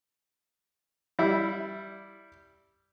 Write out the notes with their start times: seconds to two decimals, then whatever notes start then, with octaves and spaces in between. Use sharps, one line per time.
1.19 G3 E4